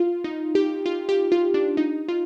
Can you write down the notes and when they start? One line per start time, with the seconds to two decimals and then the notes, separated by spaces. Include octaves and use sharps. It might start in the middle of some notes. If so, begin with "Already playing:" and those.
Already playing: F4
0.24 D#4
0.55 G4
0.86 F4
1.09 G4
1.32 F4
1.54 D4
1.77 D#4
2.08 F4